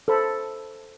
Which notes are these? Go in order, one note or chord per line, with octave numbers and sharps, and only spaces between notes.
A4 C5 B5